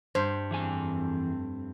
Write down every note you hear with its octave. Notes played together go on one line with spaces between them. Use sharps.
G2 C5
F2 E3 A3 C4 G#4 G#5